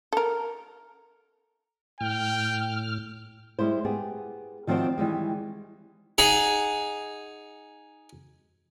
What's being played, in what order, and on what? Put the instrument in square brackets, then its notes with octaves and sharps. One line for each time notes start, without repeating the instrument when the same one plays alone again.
[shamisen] A4 A#4
[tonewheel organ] A2 F6 [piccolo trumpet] G5
[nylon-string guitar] G3 G#3 E4 C5
B3 G4 G#4
D#3 F3 C4 F#4 C5 D5
D#3 E3 G3 G#3
[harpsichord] D#4 G#4 F#5